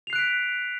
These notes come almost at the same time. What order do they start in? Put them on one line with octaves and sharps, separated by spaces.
F7 C7 F#6 D7 B6